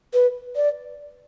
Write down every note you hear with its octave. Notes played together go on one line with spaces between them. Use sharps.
B4
D5